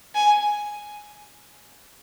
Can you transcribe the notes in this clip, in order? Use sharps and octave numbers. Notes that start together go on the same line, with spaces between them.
G#5